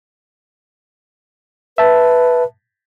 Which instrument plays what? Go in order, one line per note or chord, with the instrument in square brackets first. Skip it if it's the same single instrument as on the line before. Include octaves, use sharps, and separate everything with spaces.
[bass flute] B4 [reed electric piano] E5 A5